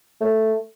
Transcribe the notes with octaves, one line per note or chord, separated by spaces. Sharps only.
A3